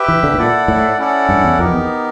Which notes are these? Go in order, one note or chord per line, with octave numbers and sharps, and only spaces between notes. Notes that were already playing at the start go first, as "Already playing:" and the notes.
Already playing: G4 B4 E5 G5
E3
D3
A2
A#2 E4 A4 D5 F#5
A2
C#4 E4 A4 D5 F#5
G2
E2
F2 B3 D#4 G4 A#4
E2